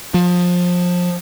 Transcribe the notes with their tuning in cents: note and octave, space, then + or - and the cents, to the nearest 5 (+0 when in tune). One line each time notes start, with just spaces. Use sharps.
F3 +25